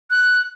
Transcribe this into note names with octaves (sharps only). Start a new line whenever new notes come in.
F#6